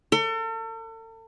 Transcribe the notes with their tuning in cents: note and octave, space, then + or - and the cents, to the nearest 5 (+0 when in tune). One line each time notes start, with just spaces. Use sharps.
A4 +40